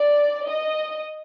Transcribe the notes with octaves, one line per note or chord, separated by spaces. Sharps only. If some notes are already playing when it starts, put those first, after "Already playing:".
Already playing: D5
D#5